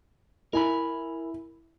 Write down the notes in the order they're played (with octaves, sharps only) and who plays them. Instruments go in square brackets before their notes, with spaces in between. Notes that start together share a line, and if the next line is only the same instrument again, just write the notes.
[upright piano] E4 [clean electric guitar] A#4 G#5 B5